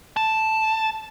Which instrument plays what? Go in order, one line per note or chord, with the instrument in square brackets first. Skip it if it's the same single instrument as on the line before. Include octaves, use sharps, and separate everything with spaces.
[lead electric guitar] A5